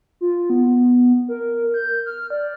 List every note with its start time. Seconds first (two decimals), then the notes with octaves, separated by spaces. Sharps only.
0.21 F4
0.50 B3
1.28 A#4
1.74 G6
2.06 F6
2.30 D5